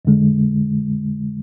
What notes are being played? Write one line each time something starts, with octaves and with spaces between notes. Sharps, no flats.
F2 D3 G#3